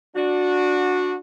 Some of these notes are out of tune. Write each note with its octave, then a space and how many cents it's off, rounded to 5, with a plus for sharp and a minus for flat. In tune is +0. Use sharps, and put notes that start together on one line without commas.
D4 +0 F#4 -20